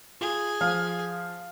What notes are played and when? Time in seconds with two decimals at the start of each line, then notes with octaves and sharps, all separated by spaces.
0.21 F4 G#4
0.61 F3 F5